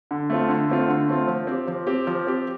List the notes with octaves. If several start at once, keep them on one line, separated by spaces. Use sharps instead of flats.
D3
A3 C4 F4
D3
A3 C4 F4
D3
A3 C4 F4
F3
C4 G4
F3
C4 G4
F3
C4 G4